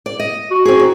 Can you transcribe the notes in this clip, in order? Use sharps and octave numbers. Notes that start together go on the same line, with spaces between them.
D5
D#5
F#4
C4 G#4
D#3